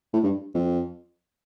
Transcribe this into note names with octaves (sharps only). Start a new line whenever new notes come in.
A2
G2
F2